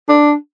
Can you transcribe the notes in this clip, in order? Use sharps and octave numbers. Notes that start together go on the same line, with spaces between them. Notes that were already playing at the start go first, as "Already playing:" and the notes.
D4